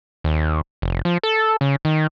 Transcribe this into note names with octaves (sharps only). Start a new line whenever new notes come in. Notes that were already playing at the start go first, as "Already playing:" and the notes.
D#2
F1
F3
A4
C#3
D#3